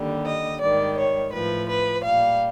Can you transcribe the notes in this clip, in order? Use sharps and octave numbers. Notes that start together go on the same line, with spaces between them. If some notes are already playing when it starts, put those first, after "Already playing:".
Already playing: D#2 D3 G3
D#5
G#2 D#3 G3 D5
C#5
A2 F3 B4
B4
A#2 G3 F5